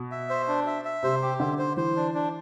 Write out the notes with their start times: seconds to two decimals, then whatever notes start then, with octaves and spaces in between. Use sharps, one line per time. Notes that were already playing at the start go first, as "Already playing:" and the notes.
Already playing: B2
0.12 E5
0.30 C5
0.48 D4
0.67 E5
0.85 E5
1.03 C3 C5
1.22 G4
1.40 D3 C5
1.58 C5
1.77 E3 C5
1.96 D4
2.14 D4